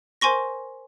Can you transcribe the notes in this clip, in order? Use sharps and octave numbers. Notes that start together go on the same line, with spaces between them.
A#4 C5 G#5 C6 C#6 A#6